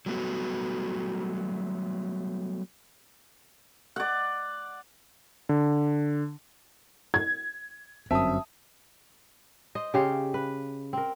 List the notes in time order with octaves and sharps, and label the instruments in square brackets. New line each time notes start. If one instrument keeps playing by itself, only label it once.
[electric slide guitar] F#3 G3 A3 B3 F#4
[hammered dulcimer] D5 F#5
[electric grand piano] D3
[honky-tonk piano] G#6
[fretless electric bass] G1 F#2 C4 [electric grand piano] E5 D#6 [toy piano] A5
[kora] C5 D#5
C#3 G4 C5 F5
B4
C4 A#4